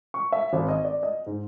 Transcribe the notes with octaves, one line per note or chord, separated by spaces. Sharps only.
C#6
E5
G#1
D#5
D5
D#5
G#2